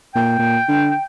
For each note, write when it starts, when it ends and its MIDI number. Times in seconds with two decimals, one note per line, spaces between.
0.15 0.38 46
0.15 1.04 79
0.39 0.58 46
0.68 0.92 50